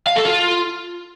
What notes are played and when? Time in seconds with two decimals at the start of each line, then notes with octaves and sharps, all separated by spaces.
0.07 F5
0.16 A4
0.25 F4